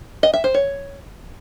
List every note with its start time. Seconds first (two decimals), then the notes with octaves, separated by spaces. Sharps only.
0.23 D#5
0.34 E5
0.44 C5
0.54 C#5